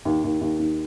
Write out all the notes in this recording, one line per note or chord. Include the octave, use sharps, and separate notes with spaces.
D#2
D#2
D#2
D#2